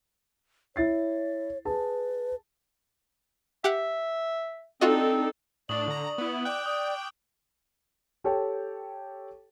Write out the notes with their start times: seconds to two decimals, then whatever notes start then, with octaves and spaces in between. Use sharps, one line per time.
0.76 E4 C#5 A6 C7
1.65 G#4 B4 A5
3.64 G4 E5 F#5
4.81 C4 D4 D#4 F4 F#4 A4 D#5
5.69 A2 D4 D5 C#6 D#6 F#7
5.88 D3 A#5
6.18 B3 E4
6.45 D5 G5 D6 F#6
6.66 D5 D#6
8.24 G4 A4 C#5 G5 A5